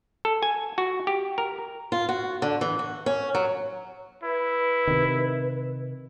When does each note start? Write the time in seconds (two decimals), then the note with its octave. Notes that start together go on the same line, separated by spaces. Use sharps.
0.25 A4
0.43 G#5
0.78 F#4
1.07 G4
1.38 A#4
1.92 F4
2.09 F#4
2.42 D3
2.61 E3
2.79 F#4
3.06 C#4
3.35 F#3
4.23 E4 B4
4.88 C3 D#3